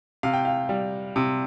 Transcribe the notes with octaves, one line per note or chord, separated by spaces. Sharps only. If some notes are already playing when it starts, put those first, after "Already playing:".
C3 F5
G5
F5
G3
C3